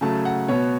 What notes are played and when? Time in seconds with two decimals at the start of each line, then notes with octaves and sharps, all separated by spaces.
0.01 C#3 F#3 A3 A5
0.25 F#5
0.48 B2 B3 C#5